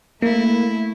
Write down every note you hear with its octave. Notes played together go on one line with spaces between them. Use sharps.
A3 A#3 E4